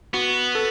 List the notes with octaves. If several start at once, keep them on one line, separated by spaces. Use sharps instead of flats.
B3 F#4
A4